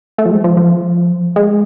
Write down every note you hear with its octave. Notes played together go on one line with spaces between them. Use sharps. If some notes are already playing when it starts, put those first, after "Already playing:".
A3
F3
G#3
F3
F3
G#3